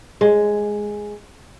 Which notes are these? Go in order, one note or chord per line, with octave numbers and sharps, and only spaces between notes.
G#3